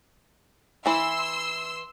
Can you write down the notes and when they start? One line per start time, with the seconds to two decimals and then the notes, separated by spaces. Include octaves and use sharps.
0.86 E3 E4 C6 E6